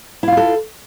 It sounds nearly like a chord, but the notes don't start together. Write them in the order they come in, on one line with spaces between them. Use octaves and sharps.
E4 F5 F4 A4